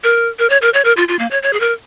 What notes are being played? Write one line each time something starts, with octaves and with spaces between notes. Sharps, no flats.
A#4
A#4
C#5
A#4
C#5
A#4
F4
F4
A#3
C#5
C#5
G#4
A#4